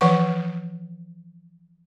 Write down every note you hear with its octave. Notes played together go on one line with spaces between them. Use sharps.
E3 F3 B4 F#5 C#6